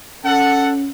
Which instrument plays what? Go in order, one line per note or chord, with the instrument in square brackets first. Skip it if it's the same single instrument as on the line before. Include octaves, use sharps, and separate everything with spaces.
[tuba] C#4 [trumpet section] A4 F#5